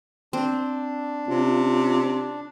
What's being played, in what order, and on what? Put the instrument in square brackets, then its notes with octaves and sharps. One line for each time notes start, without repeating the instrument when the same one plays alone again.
[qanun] C4 [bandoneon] D4
[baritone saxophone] C3 [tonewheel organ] C#4 F4